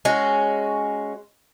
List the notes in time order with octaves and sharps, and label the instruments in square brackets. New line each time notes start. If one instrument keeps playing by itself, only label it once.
[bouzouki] G#3 C#4 F#4